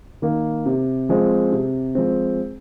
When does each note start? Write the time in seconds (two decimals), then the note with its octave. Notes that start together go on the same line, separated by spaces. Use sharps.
0.22 D#3 A#3
0.66 C3
1.09 F3 G#3 C4
1.52 C3
1.95 F3 G#3 C4